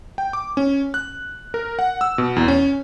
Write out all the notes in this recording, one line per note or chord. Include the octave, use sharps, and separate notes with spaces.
G5
D6
C#4
F#6
A#4
F#5
E6
B2
E2
C#4